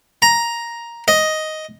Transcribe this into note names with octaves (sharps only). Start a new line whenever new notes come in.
A#5
D#5